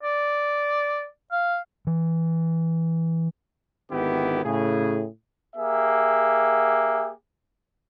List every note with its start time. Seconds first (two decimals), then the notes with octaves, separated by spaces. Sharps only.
0.03 D5
1.32 F5
1.87 E3
3.90 G#1 D3 D#3 B3 E4 G4
4.43 A2 C#3 G#4
5.56 A#3 G4 G#4 E5